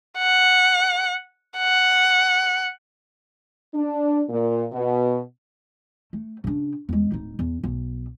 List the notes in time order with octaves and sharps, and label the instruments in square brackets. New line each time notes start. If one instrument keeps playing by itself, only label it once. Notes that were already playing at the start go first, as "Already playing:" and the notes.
[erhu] F#5
F#5
[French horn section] D4
A#2
B2
[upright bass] A3
C#3 D4
E2 G#3
D1 D#4
E2
B1